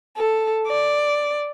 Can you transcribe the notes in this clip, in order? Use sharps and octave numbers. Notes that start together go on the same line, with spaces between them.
A4
D5